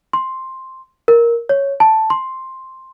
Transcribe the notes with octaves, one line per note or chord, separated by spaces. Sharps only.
C6
A#4
C#5
A5
C6